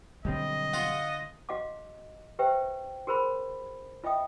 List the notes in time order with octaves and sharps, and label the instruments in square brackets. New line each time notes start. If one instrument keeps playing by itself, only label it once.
[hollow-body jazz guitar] B1 G3 C4 [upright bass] D3 [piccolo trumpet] D#5
[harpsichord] F4 F#5
[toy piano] F#4 D#5 F5 F#5 D6
G4 B4 C5 E5 G5
F#4 G#4 A#4 C5 B5
F4 D#5 E5 G5 D#6